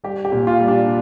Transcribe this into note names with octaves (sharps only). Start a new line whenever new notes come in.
G3 G4
G4
A#2
F4
G3
D4